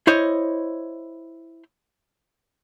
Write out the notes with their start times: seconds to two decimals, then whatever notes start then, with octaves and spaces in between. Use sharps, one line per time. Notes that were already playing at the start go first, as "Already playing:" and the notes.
0.07 E4 C5 C#5 D#5